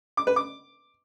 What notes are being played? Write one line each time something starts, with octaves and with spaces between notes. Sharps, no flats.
D6
B4
D6